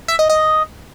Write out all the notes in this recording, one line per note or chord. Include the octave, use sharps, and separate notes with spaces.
E5
D#5
D#5